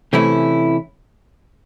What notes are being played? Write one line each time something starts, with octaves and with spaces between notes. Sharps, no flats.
C3 E3 A3 C#4 E4